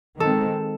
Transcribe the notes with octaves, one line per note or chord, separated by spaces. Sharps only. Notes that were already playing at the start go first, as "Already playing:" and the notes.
D#3 G#3 C4 A4